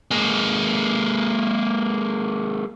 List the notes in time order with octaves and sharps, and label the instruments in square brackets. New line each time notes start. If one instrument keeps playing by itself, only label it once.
[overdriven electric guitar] G#3 A#3